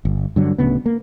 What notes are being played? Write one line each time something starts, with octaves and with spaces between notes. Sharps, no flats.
G1
G2 D3 F#3
D1 D2 C#3 B3
A#3